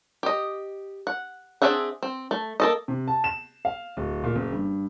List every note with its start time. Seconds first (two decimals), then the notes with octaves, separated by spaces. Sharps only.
0.23 G4 D#5
1.07 F#5
1.62 C4 D4 G#4 E5 F#5
2.03 C4
2.31 A3
2.60 A#3 A4 D#5
2.88 C3
3.08 A5
3.24 E7
3.65 F5
3.97 D1
4.24 A#2
4.35 F#1
4.53 G2